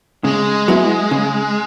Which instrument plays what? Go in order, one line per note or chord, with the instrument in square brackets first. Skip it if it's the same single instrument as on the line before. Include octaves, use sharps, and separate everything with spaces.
[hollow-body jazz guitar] C#3 [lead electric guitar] G#3
[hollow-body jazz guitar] F#3 B3 E4
C#3